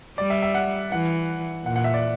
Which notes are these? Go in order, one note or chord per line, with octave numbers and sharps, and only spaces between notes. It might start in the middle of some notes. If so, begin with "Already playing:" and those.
G3 D5
E5
E5
F#5
E3 F#5
A#2 F#5
F#5
E5
D5